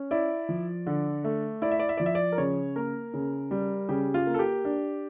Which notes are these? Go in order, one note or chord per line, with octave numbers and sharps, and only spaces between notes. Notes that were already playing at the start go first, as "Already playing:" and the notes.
Already playing: C#4
E4 D5
F3
D3
A3
E4 D5
E5
D5
E5
F3 D5
E5
D5
A#4
C#3 C#5
A#3 A#4
C#3
G3
C#3 G4
F4
A#3
A4
G4
D4